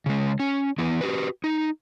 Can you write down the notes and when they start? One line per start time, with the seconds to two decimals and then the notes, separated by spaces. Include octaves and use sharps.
0.06 C#3 G#3
0.40 C#4
0.78 E3 B3 E4
1.01 F#4 G4 B4
1.44 D#4